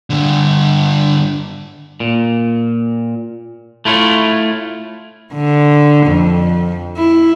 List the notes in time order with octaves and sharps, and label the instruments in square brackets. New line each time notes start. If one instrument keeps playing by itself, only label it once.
[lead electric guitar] G2 D3
[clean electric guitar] A#2
A3 E4 F4 C#5
[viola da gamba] D3
F2
E4